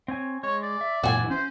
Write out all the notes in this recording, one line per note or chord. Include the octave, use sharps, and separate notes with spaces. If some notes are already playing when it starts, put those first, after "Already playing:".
C4 C#5 G#5
G#3 C#5
D5
E5
F#2 A#2 E3 F#4 G#5
C#4 C5